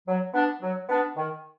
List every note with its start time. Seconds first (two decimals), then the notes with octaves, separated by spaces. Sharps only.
0.07 F#3
0.34 B3 D4
0.62 F#3
0.88 B3 D4
1.16 D#3